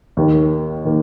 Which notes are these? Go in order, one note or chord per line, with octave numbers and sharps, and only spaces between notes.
D#2 D#3 A#3
D#3 A#3